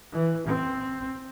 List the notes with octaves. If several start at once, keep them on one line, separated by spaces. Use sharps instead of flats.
E3
C4